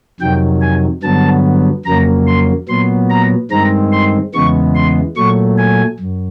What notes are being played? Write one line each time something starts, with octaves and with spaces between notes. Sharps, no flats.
F2 C3 D#3 F#3 G5
G#5
G2 D3 F#3 B3 A5
F2 C#3 F#3 A#3 A#5
C6
A#2 F#3 B3 C6
A#5
G2 D#3 G#3 C4 A#5
C6
E2 C#3 E3 G#3 B3 C#6
C6
A#2 F#3 A3 C#6
G#5
F#2